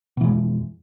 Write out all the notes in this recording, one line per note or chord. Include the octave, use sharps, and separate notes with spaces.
F2 B2 E3 G#3